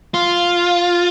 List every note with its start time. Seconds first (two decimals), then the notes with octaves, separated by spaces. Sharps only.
0.14 F4